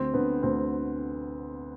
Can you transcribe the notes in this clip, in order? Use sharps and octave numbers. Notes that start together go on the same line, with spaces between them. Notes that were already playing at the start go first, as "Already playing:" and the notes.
Already playing: D2 C4
D3 B3
D2 C4